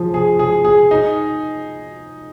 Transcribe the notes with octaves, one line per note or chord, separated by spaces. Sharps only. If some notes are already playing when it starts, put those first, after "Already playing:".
Already playing: F3 G#4
G#4
G#4
G#4
D#4